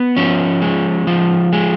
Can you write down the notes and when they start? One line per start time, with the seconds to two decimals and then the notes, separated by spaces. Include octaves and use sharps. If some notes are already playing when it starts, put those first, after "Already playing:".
Already playing: B3
0.17 F3 C#4
0.62 G#3
1.07 F3
1.53 G#3